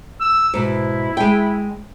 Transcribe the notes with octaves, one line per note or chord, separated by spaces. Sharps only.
E6
G#2 B2 E4
G#3 G5